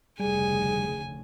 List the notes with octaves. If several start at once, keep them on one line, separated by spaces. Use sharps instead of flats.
F1 D2 C#3 G3 G#4 G#5